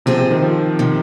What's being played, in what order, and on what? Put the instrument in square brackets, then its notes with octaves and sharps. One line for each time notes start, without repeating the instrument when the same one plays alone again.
[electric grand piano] C3 [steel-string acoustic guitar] F3 C4 G#4
[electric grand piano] C3
D#3
F3
[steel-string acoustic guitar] C3 D#3